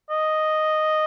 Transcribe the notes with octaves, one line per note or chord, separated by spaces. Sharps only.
D#5